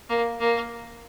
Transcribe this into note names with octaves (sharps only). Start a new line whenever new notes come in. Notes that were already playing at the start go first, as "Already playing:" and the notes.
A#3
A#3